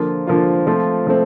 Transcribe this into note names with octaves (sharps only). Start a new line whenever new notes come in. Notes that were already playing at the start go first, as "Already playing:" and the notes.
Already playing: D3 F3 A#3 F4
D3 F3 A#3 F4
F3 A3 C4 F4
F3 A3 C4